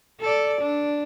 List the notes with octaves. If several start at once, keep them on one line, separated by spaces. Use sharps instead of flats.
A4 D5
D4